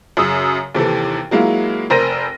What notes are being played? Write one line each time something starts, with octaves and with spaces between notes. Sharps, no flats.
F#2 C#3 D#6 E6
D#2 C3 E3 A4
F#3 G#3 A#3 E4 F4
F1 A#4 C5 A#6 D#7